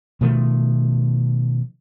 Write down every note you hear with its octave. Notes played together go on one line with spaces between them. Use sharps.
B2 D#3 F3 A3